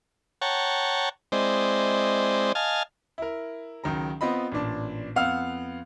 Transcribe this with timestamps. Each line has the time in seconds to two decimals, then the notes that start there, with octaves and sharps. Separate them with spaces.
0.42 C#5 F#5 G5 A5 A#5 C#6
1.32 G#3 C4 E4 C5 D5 D#5
2.55 D#5 F5 G#5 A5 F6
3.18 E4 A#4
3.84 C#2 D#3 F#3 A#5
4.21 B3 C4 F4 D#5 B5
4.52 A1 A#2 D4 A5
5.16 F2 B3 F5 F#5 E6 F6